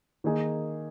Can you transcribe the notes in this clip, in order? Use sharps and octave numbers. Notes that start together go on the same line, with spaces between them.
D#3 A#3 D#4 G#4